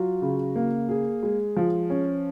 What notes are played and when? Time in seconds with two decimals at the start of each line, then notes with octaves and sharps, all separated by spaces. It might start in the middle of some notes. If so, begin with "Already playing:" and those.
Already playing: F#3 F4
0.22 C#3
0.56 A#3
0.89 G#4
1.23 G#3
1.56 F3
1.90 C#4